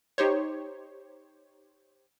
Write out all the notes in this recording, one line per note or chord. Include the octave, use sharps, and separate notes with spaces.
D#4 G4 C5 C#5